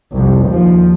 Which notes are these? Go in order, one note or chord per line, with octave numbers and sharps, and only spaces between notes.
C2 F2
D#2 F3